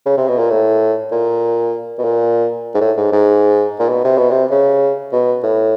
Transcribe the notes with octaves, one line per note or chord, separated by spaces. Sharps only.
C#3
C3
B2
A#2
A2
A#2
B2
A#2
G#2
A2
G#2
G#2
A#2
B2
C3
B2
C3
C#3
B2
A2